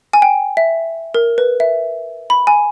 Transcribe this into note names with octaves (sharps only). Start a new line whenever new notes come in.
G#5
G5
E5
A#4
B4
E5
B5
G#5